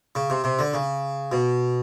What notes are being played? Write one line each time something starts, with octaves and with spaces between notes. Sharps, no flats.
C#3
C3
C3
D3
C#3
B2